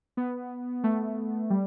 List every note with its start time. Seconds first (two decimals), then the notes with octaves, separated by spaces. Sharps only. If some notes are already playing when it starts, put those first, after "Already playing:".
0.17 B3
0.84 A3
1.50 G3